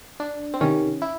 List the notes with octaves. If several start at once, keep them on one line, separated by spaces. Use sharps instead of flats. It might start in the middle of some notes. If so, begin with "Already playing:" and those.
D4
C4
C3 D#3 C#4
E4